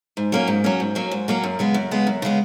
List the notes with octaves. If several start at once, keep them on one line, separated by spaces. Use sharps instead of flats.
G#2
F#3 A#3 C#4
G#2
F#3 A#3 C#4
G#2
F#3 A#3 C#4
G#2
F#3 A#3 C#4
F#2
C#3 G#3 B3
F#2
C#3 G#3 B3
F#2
C#3 G#3 B3